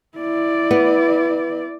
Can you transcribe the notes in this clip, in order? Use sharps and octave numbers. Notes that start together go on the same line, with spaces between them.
E4 D5
B3